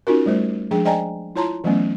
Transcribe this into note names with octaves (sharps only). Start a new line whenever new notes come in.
C#4 D#4 F4 F#4 A#4
G3 A3 C5
F3 G#3 D4 G#4 G5
C5 D5 D#5 G5 G#5 A#5
E4 F4 C#5 A5 A#5 C6
E3 F#3 A3 B3 C#4